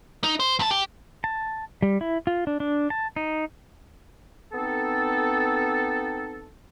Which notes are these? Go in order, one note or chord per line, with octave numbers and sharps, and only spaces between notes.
D#4
C5
G2 A5
G4
A5
G3
E4
F4
D4
D4
A5
D#4
B3 C4 D#4 A4